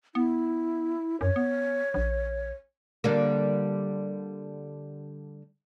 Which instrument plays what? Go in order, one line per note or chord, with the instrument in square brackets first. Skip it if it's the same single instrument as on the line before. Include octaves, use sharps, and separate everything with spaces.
[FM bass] B3 [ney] E4
[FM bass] F#2 [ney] C#5
[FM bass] B3
A#1
[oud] D3 G3 A#3